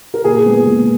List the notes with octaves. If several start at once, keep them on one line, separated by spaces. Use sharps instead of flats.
A#4
A#2 G#4
G#3 B3
A#2